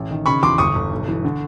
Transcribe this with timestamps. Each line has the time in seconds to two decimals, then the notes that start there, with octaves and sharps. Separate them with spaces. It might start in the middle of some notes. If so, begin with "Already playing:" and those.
Already playing: A1
0.11 D#3
0.26 C#3 B5 C#6
0.43 E2 C6 D6
0.58 G1 C#6 D#6
0.75 G1
0.91 B1
1.08 E3
1.24 D3